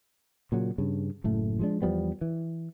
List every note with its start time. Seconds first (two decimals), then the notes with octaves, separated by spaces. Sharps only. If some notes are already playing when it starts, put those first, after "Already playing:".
0.52 A#2 C#3 F#3
0.78 G2 C#3
1.24 F#1 A2 A3
1.59 F3 G#3 D4
1.82 E2 F3 G3 B3
2.21 E3